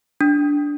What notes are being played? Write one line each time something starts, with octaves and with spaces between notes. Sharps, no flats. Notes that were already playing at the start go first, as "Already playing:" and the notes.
D4